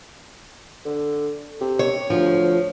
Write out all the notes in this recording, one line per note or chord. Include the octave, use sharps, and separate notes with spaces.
D3
C3
C#5
D2 F3